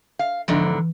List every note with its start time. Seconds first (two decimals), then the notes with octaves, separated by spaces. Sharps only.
0.19 F5
0.48 E2 G#2 D3 F3
0.77 E3